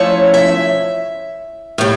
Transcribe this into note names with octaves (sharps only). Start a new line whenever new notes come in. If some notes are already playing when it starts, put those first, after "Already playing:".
Already playing: F3 A3 C#4 E4 C#5
E5
A2 G3